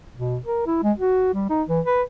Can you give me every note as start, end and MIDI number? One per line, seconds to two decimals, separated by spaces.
0.17 0.37 47
0.46 0.64 70
0.66 0.83 64
0.83 0.92 56
0.98 1.32 66
1.34 1.46 55
1.49 1.63 63
1.68 1.80 52
1.85 2.02 71